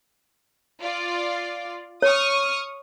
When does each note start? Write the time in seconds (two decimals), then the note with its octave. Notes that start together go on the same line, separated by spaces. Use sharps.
0.81 F4 D5
2.02 C#5 C#6 D#6 F6